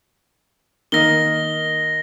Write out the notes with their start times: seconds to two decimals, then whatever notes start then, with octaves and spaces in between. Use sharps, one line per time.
0.92 D#3 A#3 D#4 A#6 G7